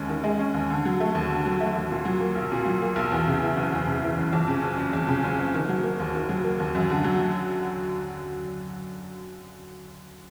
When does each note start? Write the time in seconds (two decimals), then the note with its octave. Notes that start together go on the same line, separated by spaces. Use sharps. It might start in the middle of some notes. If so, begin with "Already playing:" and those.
Already playing: D#2 G#3 C#4
0.09 D#3
0.24 G#3
0.39 C#4
0.54 D#2
0.70 D3
0.85 F#3
1.00 A3
1.15 D#2
1.30 D3
1.46 F#3
1.60 A3
1.75 D#2
1.91 A#2
2.05 F#3
2.20 A#3
2.35 B1
2.52 A#2
2.66 F#3
2.82 A#3
2.96 B1
3.12 E2
3.27 C#3
3.42 E3
3.57 F#1
3.72 E2
3.87 C#3
4.03 E3
4.18 F#1
4.33 F2
4.48 C#3
4.63 F#1
4.78 F#1
4.93 F2
5.09 C#3
5.24 F#1
5.38 F#1
5.54 D#3
5.69 F#3
5.83 A#3
6.00 D#2
6.15 D#3
6.29 F#3
6.44 A#3
6.60 D#2
6.75 F#2
6.90 D3
7.04 F#3